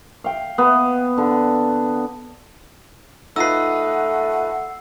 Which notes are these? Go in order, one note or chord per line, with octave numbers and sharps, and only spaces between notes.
F5 G5
B3
D3
A3 D#4 F4 B4 F#5 E6 C7